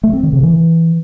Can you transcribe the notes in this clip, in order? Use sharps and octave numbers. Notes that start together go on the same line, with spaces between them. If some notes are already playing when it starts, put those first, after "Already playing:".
A3
C4
D#3
C#3
E3